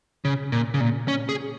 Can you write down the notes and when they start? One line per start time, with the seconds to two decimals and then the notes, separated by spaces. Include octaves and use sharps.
0.25 C#3
0.52 A#2
0.74 C#3
0.81 A#2
1.08 C#4
1.29 G#4